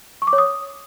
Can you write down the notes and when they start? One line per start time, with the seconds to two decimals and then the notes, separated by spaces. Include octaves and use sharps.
0.22 C#6
0.27 D6
0.33 C#5
0.38 D#6